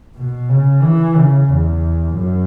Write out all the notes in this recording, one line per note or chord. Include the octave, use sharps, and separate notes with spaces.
B2
C#3
E3
C#3
E2
F#2